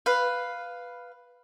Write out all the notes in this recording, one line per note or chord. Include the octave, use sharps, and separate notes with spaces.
B4 F5